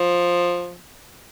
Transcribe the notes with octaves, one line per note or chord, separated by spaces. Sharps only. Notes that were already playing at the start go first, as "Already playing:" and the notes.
Already playing: F3